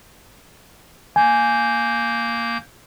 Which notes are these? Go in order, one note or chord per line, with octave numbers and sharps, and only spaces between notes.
A#3 G#5 G6